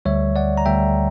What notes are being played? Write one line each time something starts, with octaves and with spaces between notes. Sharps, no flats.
D2 D3 G3 C#5 E5
D5 F#5
A#5
D2 D3 G3 E5 G5